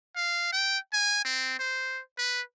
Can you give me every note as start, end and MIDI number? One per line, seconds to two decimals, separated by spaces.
0.16 0.47 77
0.52 0.78 79
0.93 1.21 80
1.25 1.59 60
1.59 2.01 72
2.18 2.42 71